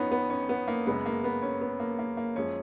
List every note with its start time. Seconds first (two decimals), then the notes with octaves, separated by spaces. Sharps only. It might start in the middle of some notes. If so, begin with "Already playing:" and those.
Already playing: F2 F3 B3 C#4 D#4
0.12 B3
0.30 C#4
0.49 B3
0.68 A#3
0.87 F#2 C#3 G#3 B3
1.06 A#3
1.24 B3
1.42 C#4
1.61 B3
1.80 A#3
1.99 A#3
2.17 A#3
2.36 F#2 F3 G#3 C#4